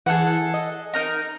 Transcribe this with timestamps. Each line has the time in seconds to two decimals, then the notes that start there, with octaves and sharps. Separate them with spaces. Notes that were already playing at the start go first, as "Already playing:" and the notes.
0.06 E3 G#4 A4 F#5
0.54 D#5
0.94 D#4 A#4 A#5